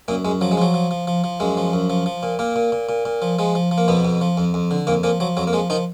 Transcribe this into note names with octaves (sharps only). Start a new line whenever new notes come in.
F#2 A#2 A#3
F#2 G#3
F3 F#3
G#3
F3 F#3
F3
F3
F3
F3
F#2 G#3
F3
F#2
F3
F3
A#2
A#2 A#3
A#2
A#2
A#2
A#2
F3
F3 G#3
F3
F3
A#3
F2 B2 B3
F2
F3
F2
F2
D3
F2 A#2 A#3
A#2 F3 A#3
F3 F#3
F2 F#3
A#3
F3 G#3
D#3 F3 D#4